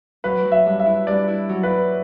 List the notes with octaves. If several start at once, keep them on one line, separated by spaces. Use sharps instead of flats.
F#3 B4
F#3
E5
G2
E5
E4
G2 D5
E4
F#3
B4
E4